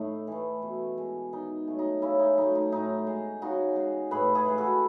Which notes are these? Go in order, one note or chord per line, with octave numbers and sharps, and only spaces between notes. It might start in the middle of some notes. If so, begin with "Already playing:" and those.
Already playing: A2 A3 D#4
E3 A3
B2
G#3
D#3 D#4
F#3 A3
D#4
C#3 C#4 E4
D#4
F#3 A3 D#4
D#4
A2 D#4
G#3
C#3 D#4 F#4
G#3
A2 G#4 B4
G#4 B4
E3 G#3
F#4 A4